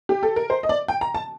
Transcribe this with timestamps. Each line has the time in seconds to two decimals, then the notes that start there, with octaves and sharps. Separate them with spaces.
0.09 G4
0.23 A4
0.36 A#4
0.50 C5
0.63 D#5
0.69 D5
0.88 G5
1.01 A#5
1.15 A5